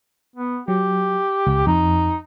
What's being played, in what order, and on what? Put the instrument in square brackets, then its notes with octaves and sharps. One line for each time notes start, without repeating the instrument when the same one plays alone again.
[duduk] B3
[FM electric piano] F#3 [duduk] G4
[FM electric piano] C#2
[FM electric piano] F2 [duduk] D#4